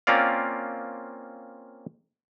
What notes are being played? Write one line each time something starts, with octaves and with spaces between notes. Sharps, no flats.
A#3 C4 C#4 F4 D5 F5